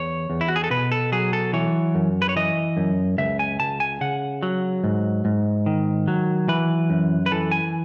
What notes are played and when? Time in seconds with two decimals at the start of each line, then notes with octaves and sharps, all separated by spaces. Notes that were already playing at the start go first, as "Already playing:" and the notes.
Already playing: E2 C#5
0.30 E2
0.41 E4
0.48 F#4
0.56 G#4
0.64 A4
0.71 B2 B4
0.92 A4
1.12 F#3 G#4
1.33 A4
1.53 E3 C#5
1.95 F#2
2.22 B4
2.29 C#5
2.36 E3 D#5
2.77 F#2
3.18 C#2 E5
3.39 G#5
3.60 C#2 A5
3.80 G#5
4.01 C#3 F#5
4.43 F#3
4.84 G#2
5.25 G#2
5.66 D#3
6.08 F#3
6.48 E3 B4
6.90 F#2
7.26 B4
7.32 E3 A4
7.51 G#5